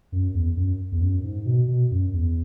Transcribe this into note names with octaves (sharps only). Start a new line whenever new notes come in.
F#2
E2
F#2
E2
F#2
G#2
B2
B2
F#2
E2